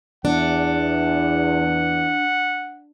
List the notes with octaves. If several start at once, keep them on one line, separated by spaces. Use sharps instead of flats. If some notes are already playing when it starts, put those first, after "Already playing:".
E2 D4 F#5